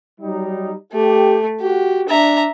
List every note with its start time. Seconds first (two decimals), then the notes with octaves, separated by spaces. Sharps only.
0.21 F#3 G3 D#4
0.93 A3 G4
1.60 F#4 G4
2.09 D4 E5 A#5